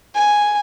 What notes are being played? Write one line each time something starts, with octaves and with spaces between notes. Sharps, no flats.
G#5